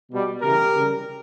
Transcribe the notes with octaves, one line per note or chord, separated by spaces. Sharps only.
B2 G3
C#3 E3 G3 G4 A#4
C#3 G3